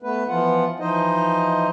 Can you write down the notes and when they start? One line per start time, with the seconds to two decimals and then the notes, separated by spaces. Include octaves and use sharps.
0.02 A3 B3 B4
0.28 E3 F3 B3 F4 F#5
0.80 E3 F3 D#4 C5 D#5